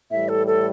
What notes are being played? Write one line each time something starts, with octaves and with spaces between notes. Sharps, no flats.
A2 E3 G3 E5
A4
A4